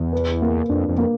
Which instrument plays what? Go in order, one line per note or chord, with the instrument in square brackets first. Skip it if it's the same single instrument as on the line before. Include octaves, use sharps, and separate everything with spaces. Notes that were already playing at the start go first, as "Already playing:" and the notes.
Already playing: [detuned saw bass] E2
[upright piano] B4
A#3
[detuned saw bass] F2 [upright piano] D4
[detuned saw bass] F2
[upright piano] A#3